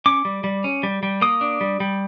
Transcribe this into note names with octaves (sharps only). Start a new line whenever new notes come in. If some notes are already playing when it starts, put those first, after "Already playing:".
C#4 D6
G3
G3
C#4
G3
G3
A#3 D#6
D4
G3
G3